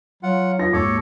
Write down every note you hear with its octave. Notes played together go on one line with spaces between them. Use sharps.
F#3 F4 F#5
B3 F4 A#6
G#1 D#2 A4 C#5 D6